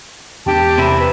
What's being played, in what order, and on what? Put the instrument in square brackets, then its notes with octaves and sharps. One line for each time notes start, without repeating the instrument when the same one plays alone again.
[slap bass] E2 B3 D4 [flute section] G4 G5 A5
[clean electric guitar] C3 E4
[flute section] B4 E5